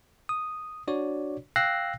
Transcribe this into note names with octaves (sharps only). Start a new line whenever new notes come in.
D#6
D4 F#4 C#5 D5
F5 G5 E6 F#6 A#6 C7